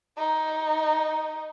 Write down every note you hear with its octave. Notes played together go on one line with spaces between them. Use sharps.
D#4